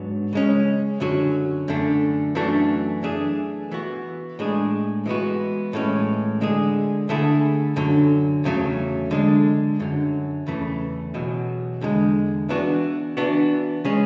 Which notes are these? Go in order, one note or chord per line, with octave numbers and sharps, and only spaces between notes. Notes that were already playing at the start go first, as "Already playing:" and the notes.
Already playing: G#2 F#3 B3 D4
C#3 G#3 C#4
F#2 D3 F#3 C#4 F#4
F#2 D3 A3
F#2 E3 A3 D4 F#4
E3 A3 D4 G#4
E3 B3 F#4
A2 G#3 D4 G#4
E3 G#3 B3 F#4
A2 E3 G#3 C#4
D3 G#3 D4 G#4
D3 A3 E4 G#4
F#2 D3 F#3
E2 C#3 F#3 A3
D3 G#3 D4
F#2 D3 F#3
E2 C#3 E3 A3
E2 B2 F#3
E2 D3 G#3
E3 B3 D4 F#4
E3 B3 D4 F#4
C#3 G#3 C#4 G#4